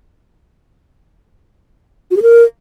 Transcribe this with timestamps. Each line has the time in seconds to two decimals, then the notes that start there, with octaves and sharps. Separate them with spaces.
2.11 F#4
2.17 G#4
2.22 A#4